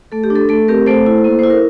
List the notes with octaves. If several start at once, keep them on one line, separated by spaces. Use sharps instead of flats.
A3 A4
G4
D4
A4
A3 A4
C4 G4 A#4
A3 A4 C5
E4
A#3
E4 C5
A#4